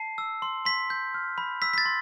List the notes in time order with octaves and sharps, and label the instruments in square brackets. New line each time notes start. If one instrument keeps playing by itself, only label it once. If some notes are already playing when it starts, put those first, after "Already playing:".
Already playing: [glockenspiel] A5 C7
E6
C6
C6 B6
G6
F6
B5
E6 B6
B6
A6
C6